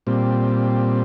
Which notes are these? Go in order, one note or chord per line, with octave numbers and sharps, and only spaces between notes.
A#2 G3 C4